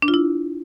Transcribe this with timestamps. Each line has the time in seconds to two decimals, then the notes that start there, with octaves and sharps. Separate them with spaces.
0.02 D4
0.08 F4
0.14 E4